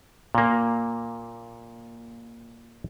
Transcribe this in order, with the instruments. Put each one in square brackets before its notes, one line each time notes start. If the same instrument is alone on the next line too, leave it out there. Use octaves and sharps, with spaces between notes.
[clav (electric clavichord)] A#2 A#3